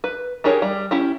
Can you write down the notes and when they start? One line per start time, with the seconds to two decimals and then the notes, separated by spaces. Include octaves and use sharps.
0.04 B4
0.44 D4 G4 G#4 A#4 C#5
0.62 G3
0.91 C#4 E4 G4